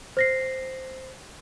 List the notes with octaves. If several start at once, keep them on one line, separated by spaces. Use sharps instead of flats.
C5 A#6 C7